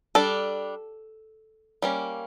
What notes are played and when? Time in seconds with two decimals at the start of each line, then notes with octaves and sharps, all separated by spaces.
0.15 G3 D4 A4
1.82 G3 A#3 C#4